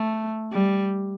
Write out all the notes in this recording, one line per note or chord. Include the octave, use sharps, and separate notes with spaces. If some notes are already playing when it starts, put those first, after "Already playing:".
Already playing: A3
G3